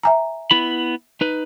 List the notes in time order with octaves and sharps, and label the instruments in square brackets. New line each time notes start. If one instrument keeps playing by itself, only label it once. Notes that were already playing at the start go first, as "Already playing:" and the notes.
[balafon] E5 G#5 A#5
[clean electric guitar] B3 E4 B5
D#4 B4